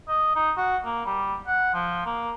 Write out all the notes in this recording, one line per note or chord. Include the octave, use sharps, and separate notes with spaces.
D#5
D#4
F#4
A#3
G3
F#5
F3
A#3